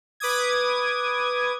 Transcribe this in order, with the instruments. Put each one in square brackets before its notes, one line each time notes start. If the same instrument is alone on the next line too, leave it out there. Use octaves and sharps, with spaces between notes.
[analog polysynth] B4 D6 D#6 G#6